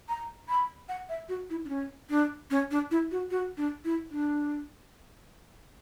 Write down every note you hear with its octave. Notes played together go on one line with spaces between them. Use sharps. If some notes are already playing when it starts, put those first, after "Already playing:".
A#5
B5
F#5
E5
F#4
E4
D4
C#4
D4
C#4
D4
E4
F#4
F#4
D4
E4
D4